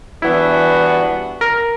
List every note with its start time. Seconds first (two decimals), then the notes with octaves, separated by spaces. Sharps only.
0.22 E3 G3 B3 D4 E4 F#4
1.41 A#4